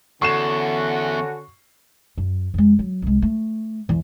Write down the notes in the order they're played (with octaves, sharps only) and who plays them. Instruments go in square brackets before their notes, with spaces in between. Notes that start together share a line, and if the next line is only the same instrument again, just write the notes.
[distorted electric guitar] E2 [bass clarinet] D3 [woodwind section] C#4 F#4 [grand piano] C#6 C7 E7
[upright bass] F#2
F2 G#3
F#3
C2 G#3
A3
E2